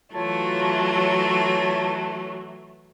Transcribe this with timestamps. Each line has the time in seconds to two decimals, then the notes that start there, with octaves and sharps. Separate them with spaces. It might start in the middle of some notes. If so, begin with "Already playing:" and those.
0.14 E3 F#3 A3 F4 C#5 A5